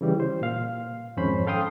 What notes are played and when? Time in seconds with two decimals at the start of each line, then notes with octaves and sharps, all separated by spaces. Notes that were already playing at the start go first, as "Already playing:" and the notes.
0.01 C#3 E3 G3
0.20 C5
0.41 A#2 F5
1.17 F2 G#2 D#3 C#4 C5 B5
1.47 A4 F5 G5 C6 D#6